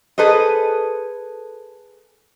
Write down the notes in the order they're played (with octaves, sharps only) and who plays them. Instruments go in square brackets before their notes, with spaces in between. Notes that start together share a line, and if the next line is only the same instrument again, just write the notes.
[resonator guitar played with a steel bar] G#4 A4 B4 C5 D#5